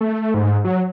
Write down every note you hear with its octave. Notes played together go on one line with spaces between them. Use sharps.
A3
G#2
F#3